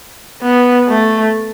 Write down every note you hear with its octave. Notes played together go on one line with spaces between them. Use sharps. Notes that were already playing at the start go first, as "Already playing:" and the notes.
B3
A3